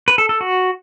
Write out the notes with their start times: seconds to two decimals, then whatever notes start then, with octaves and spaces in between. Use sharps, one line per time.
0.08 B4
0.18 A4
0.29 A4
0.41 F#4